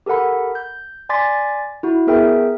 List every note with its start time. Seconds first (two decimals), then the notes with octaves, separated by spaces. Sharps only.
0.06 G4 A4 A#4 F#5 B5
0.55 G6
1.09 D5 G#5 C6 D6 A6 B6
1.83 E4 F#4
2.07 B3 G#4 A#4 E5 G5